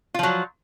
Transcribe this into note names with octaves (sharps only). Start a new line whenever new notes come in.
F3 F#3 F4